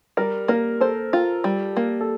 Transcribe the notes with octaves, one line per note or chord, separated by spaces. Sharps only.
G3 A#4
A#3 A#4
A4 C5
F4
G3
A#3
A4